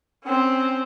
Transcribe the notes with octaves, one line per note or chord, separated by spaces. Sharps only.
C4 C#4